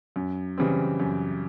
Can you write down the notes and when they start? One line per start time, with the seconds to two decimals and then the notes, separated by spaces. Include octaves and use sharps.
0.16 F#2
0.58 C#3 E3 G3 C4
1.00 F#2